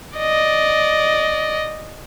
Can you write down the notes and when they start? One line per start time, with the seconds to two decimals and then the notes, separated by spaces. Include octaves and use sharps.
0.17 D5 D#5